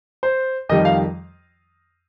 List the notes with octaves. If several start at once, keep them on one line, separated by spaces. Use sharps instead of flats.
C5
F2 D#3 G3 D#5
F5